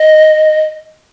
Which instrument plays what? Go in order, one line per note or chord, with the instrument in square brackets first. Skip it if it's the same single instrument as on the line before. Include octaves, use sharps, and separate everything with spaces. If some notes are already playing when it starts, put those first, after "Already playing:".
Already playing: [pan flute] D#5